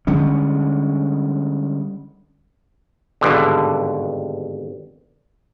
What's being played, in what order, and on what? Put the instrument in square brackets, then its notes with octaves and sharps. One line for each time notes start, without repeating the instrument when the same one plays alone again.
[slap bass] D3 G3 G#3 C#4
[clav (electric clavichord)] G#1 G2 B2 D3